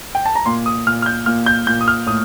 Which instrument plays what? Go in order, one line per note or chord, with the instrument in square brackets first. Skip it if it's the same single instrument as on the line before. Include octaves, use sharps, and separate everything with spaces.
[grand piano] G5
A5
A#5
A#2 C6
D#6
A#2 F6
F6
G6
A#2 F6
G6
A#2 G6
D#6
F6
A2 D#6